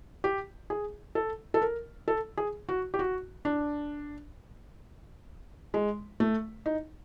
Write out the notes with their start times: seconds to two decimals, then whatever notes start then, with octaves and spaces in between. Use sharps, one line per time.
0.24 G4
0.70 G#4
1.15 A4
1.54 A4
1.62 A#4
2.08 A4
2.37 G#4
2.69 F#4
2.94 G4
2.99 F#4
3.45 D4
5.74 G#3
6.20 A3
6.66 D#4